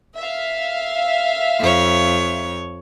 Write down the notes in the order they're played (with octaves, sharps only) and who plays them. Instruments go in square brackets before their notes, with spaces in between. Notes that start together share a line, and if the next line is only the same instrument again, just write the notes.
[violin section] E5 F5
[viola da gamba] F2 C#5